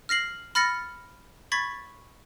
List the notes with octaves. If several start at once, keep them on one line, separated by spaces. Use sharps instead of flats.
F6 A#6 C7 F#7
B5 F6 A6 A#6 C#7
B5 C#6 G#6 A6 B6